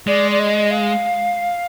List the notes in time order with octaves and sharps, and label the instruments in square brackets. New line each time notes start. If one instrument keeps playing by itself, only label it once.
[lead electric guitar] G#3 [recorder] D5
[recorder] D5
D#5
F5